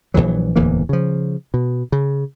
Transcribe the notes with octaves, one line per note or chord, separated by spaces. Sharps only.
A#1 F2 E3 F#3
D1 E2 E3 A#3
C#3 F3
B2
C#3